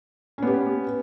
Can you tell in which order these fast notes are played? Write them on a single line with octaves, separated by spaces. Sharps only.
C#4 B3 G4